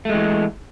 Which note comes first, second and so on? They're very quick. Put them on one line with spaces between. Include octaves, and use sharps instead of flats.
A3 G#3 E3